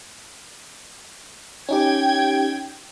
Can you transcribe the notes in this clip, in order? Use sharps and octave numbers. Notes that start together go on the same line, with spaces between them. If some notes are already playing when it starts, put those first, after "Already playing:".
C#4 D#4 G4 G5 G#6